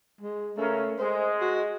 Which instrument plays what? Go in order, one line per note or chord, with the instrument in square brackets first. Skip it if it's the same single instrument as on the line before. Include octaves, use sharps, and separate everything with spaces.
[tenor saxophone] G#3
[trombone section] C#3 C#4 A#4 [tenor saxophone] A3
[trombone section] G#3 [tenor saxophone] C5
[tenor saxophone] F#4